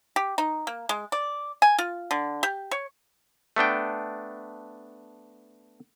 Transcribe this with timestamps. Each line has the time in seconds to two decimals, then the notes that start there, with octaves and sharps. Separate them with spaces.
0.16 G4
0.38 D#4
0.67 A#3
0.89 G#3
1.12 D5
1.62 G#5
1.78 F4
2.11 D3
2.43 G4
2.71 C#5
3.56 A3 B3 D4 G5